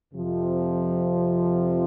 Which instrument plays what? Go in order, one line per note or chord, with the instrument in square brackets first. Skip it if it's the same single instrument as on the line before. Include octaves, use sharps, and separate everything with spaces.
[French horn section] F2 C3 F3